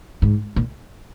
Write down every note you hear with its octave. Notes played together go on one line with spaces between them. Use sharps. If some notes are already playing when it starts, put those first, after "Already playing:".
G#2
A#2